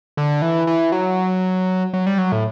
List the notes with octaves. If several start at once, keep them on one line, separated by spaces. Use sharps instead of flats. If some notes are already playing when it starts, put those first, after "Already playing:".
D3
E3
E3
F#3
F#3
G3
F#3
A2